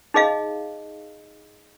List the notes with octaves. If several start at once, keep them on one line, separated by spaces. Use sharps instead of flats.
D#4 G#4 D#5 F5